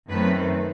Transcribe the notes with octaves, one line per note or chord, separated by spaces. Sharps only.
F#2 D#3 A3 C4 B4